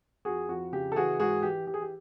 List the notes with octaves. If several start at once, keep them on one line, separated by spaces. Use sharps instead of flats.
F2 F#4 G#4
F2 F#4
C#3 G4
A4
E3 F#4 G#4
G#2 F#4 G#4
E3 G4
E3 G4
G#4
G4